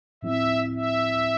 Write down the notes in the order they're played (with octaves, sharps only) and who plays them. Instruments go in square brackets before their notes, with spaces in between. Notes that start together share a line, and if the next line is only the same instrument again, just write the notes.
[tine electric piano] A2 F3 C4 E4 [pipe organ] E5
[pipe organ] E5